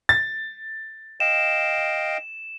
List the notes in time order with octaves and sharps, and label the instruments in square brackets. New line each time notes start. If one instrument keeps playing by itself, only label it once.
[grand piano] A6
[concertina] D#5 F5 G5 [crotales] E7